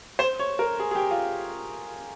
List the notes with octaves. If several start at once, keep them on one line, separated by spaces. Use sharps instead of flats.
C5
C#5
A#4
G#4
G#4
G4
F4